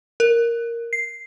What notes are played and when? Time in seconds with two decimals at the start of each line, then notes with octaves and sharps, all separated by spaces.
0.20 A#4
0.93 C7